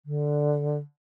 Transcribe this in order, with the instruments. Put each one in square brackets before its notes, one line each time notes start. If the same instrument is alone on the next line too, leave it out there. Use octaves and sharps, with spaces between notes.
[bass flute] D3